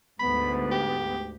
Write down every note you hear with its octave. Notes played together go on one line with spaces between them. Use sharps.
D2 G#2 B3 B5
G4